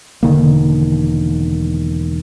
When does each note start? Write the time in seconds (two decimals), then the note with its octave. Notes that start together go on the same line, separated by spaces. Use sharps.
0.23 E1 D3 D#3 A#3